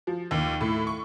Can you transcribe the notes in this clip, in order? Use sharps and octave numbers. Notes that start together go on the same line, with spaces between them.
F3
D#2
A2
C#6